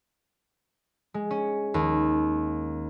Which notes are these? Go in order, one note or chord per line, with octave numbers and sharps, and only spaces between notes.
G#3
C#4
D#2